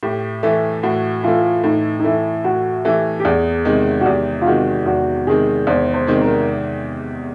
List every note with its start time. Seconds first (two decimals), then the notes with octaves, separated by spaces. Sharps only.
0.03 A2 G4
0.43 E3 A3
0.83 A2 F#4
1.23 E3 A3 F4
1.64 A2 D#4
1.99 D#4
2.04 E3 A3 E4
2.44 A2 F#4
2.85 E3 A3 G4
3.19 G4
3.25 E2 G#4
3.65 C3 D#3 G#3
4.01 F#4
4.06 E2 G4
4.42 F4
4.46 C3 D#3 G#3 F#4
4.86 E2 F#4
5.27 C3 D#3 G#3 G#4
5.67 E2 C5
5.94 C5
6.07 C3 D#3 G#3
6.21 A#4